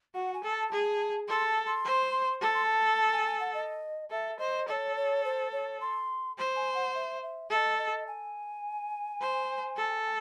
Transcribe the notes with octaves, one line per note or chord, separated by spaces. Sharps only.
F#4 F#5
G#5
A4
A5
G#4
A4 C6
A5
C6
C5
A4 A5
C6
A5
A5
G#5
G#5
F#5
D#5
A4 E5
C5 D#5
A4 C#5 D#5
C#5
C5
C#5
C6
C5
G#5
F#5
E5
E5
A4 E5
D#5
D#5
G#5
C5
A4